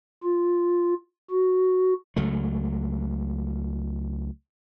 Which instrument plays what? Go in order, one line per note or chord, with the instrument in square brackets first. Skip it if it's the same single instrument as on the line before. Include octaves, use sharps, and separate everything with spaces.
[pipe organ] F4
F#4
[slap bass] C#2 F#3 A3